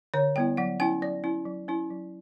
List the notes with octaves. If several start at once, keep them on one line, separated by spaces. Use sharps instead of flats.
D3 C#5
G3 B3 E4 G5
F#3 F#5
C#4 E4 G5
F#3 D5
C#4 E4
F#3
C#4 E4
F#3